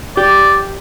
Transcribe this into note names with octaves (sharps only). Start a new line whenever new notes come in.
G4 D5